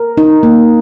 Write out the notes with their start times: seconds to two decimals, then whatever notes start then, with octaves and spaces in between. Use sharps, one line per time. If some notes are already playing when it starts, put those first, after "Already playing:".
Already playing: A#4
0.18 D#4
0.43 A#3